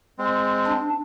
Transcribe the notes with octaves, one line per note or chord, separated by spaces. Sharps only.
G#3 C4
D4